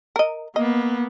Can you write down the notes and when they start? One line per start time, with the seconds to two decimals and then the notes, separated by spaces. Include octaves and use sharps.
0.16 A#4 D#5
0.56 A#3 B3 D#5